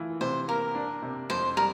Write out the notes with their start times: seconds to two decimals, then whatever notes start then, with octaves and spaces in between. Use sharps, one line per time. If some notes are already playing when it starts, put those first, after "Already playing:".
Already playing: E3 A3 F4
0.21 C3 C5
0.48 A#3 A#4
0.75 D4
1.02 C3
1.30 F2 C5
1.57 G3 A#4